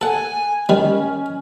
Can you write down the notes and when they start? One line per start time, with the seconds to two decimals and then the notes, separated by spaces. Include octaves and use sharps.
0.01 A4 F#5 G#5
0.69 D#3 G3 C#4